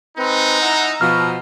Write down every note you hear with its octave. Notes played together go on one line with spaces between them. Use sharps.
G#3 C4 D#4 B4
E4 F#5 A#5 E6
B2 F3 F6